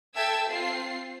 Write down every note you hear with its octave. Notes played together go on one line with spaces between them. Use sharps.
A4 E5 G5 A5 E6 G#6
C4 F4 C7